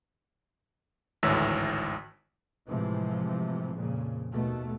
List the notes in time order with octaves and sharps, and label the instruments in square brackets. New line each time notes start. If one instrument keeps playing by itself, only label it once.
[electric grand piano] G#1 D2 A2 E3 C#5 E6
[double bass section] A2 C3 E3 F3 G#3
F2 A#2 C#3
D#2 B2 A3